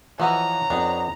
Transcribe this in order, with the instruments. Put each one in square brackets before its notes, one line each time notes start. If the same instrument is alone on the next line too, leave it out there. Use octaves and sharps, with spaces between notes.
[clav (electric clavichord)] E3 F3 D#5 [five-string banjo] B3 F#4 A4 [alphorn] C#5 [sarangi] A#5
[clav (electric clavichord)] F2 B3 D#4 [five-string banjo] D4